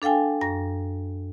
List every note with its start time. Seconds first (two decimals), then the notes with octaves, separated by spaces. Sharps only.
0.02 D4 A4 F5 G5 G#5
0.41 F#2 A#6